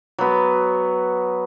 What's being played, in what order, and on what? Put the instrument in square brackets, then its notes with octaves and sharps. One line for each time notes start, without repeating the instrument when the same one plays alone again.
[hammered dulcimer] F#3 B3